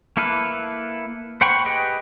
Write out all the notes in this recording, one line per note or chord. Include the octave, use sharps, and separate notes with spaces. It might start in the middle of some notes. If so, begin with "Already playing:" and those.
A#3 E4 A4 B4 F5
C5 F#5 G5 B5 C#6
G4 G#4 B4 D#5 G5